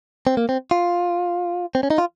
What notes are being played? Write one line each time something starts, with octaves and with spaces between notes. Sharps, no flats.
C4
A#3
C4
F4
C4
C#4
D#4
F4